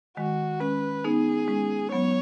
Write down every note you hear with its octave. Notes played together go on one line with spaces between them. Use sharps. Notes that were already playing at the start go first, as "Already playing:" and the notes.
D#3 G#3 F#4
G#3 C#4 B4
B3 D#4 G#4
G#3 C#4
F#3 B3 C#5